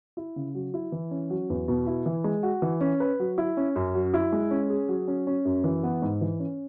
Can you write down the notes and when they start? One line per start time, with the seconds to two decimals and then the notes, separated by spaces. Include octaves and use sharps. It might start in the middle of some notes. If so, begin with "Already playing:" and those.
0.17 E4
0.36 C#3
0.55 F#3
0.74 E4
0.92 E3
1.11 C#4
1.30 F#3
1.50 E2
1.68 B2
1.87 E4
2.06 E3
2.24 G#3
2.43 F#4
2.62 E3
2.81 C#4
3.00 B4
3.20 F#3
3.38 E4
3.57 C#4
3.76 F#2
3.95 F#3
4.14 E4
4.32 G#3
4.51 C#4
4.70 G#4
4.89 F#3
5.08 C#4
5.27 C#4
5.45 F#2
5.64 E3
5.83 B3
6.02 G#2
6.21 E3
6.40 C#4